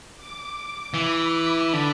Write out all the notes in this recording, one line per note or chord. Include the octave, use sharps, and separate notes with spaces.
D6
E3 B5
D3